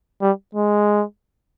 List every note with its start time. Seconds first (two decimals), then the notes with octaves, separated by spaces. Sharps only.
0.22 G3
0.55 G#3